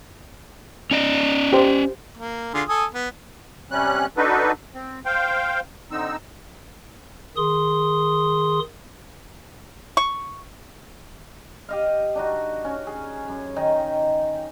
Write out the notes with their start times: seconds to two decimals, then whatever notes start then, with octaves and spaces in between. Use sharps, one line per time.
0.91 C#4 D5 D#5
1.53 G4 C5
2.17 A#3
2.54 D3 F4 G#4
2.69 A4 G#5 D#6
2.94 B3
3.71 C3 G3 C#4 F#6
4.17 D4 D#4 F#4 A4 B4
4.74 C4
5.06 C5 F5 G5
5.91 D3 C4 D#4 E6
7.37 D#3 G#4 C6 D#6
9.97 C#6
11.69 G4 D#5 F5
12.15 D4 D#4 F#4
12.65 C#4
12.87 G#4
13.28 F#2
13.56 D#3 D#4 G5